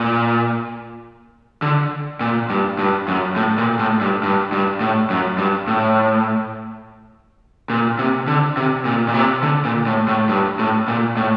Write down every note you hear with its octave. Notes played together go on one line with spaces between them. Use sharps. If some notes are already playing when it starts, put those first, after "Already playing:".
Already playing: A#2
D3
A#2
G2
G2
F#2
A2
A#2
A2
G2
G2
G2
A2
F#2
G2
A2
A#2
C3
D3
C3
A#2
A#2
C3
D3
A#2
A2
A2
G2
A2
A#2
A2